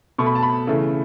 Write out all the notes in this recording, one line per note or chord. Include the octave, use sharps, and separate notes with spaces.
B2 A3 C#6
B5
A5
B5
C#3 E3 A3